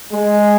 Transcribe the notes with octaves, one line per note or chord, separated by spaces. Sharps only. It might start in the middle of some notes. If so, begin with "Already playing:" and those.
G#3